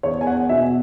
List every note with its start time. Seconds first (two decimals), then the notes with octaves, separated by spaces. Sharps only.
0.03 E2 C#5
0.21 G#5
0.27 F#5
0.49 B2 E5